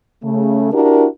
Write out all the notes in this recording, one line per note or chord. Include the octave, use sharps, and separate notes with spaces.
C#3 A3
D4 E4 F#4 G4 A#4